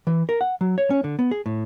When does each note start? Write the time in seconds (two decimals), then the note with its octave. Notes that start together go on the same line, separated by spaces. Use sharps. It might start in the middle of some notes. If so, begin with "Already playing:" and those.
0.07 E3
0.29 A#4
0.41 F#5
0.61 F#3
0.78 C#5
0.90 C#4
1.04 D3
1.19 B3
1.31 G#4
1.46 A2